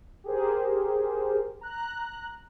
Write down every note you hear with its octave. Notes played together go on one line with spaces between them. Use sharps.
G4 G#4 A#4 C5
A#5 F#6